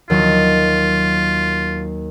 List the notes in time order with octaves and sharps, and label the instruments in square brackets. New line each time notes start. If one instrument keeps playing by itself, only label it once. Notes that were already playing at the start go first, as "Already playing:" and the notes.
[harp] D#2 F#3 [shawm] F4